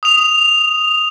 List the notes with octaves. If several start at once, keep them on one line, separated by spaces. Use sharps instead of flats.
D#6 F7